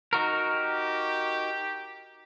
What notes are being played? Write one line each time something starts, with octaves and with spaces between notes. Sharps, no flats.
D#4 F#4 A#4
G4